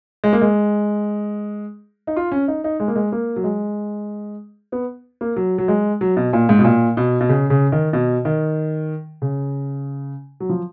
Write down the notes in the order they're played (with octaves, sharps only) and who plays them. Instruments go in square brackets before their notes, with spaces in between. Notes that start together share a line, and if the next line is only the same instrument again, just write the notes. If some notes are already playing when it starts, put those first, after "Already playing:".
[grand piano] G#3
A#3
G#3
D#4
F4
C#4
D#4
D#4
G#3
A#3
G#3
A#3
F#3
G#3
B3
A#3
F#3
F#3
G#3
F#3
B2
A#2
G#2
B2
A#2
B2
B2
C#3
C#3
D#3
B2
D#3
C#3
F#3
F3